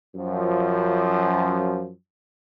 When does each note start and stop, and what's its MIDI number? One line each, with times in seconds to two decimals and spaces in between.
0.16 1.90 42
0.16 1.90 53